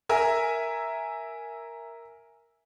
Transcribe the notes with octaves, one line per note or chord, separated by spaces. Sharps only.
A#4 E5 G#5